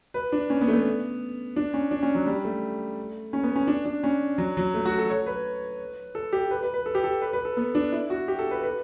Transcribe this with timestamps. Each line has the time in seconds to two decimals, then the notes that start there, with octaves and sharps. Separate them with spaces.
0.14 B4
0.32 D4
0.50 C#4
0.61 B3
0.68 A3
0.73 B3
1.56 D4
1.74 C#4
1.91 D4
2.03 C#4
2.15 F#3
2.27 G3
2.45 A3
3.33 C#4
3.43 B3
3.56 C#4
3.67 D4
3.85 D4
4.04 C#4
4.38 F#3
4.57 F#3
4.74 A3
4.85 F#4
4.98 A4
5.10 C#5
5.26 B4
6.15 A4
6.33 G4
6.51 B4
6.63 B4
6.74 B4
6.86 A4
6.95 G4
7.04 A4
7.22 B4
7.33 B4
7.45 A4
7.57 B3
7.75 D4
7.92 E4
8.10 F#4
8.28 G4
8.39 A4
8.51 B4
8.63 B4